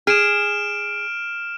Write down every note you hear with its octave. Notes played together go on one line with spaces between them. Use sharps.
G#4 F6 D7 E7